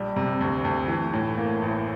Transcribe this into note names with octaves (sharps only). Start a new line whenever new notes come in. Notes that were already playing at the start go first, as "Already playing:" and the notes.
Already playing: A#1 G3
C3
D2
D2
E3
A2
A#3
A1